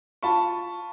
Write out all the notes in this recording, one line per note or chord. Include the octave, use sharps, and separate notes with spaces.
F4 A5 B5 C#6